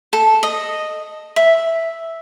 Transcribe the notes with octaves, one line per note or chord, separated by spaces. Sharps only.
A4
D#5
E5